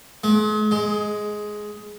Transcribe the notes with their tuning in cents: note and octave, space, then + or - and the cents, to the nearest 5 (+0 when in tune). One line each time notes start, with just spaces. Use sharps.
G#3 +40
G#3 +10